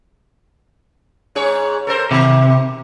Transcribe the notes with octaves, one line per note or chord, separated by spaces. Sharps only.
G#2 G#4 C#5
A4 A#4 C5
C3 D#3